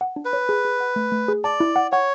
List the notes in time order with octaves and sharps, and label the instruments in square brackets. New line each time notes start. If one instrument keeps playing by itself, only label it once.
[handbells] F#5
D4
[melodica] B4
[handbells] C#5
G#4
G#4
F#5
A3
A3
G#4
[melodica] D5 [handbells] A5
[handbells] E4
F#5
[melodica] C#5 [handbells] F#5